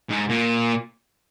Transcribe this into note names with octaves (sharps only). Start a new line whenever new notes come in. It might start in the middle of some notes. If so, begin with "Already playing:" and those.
G#2
A#2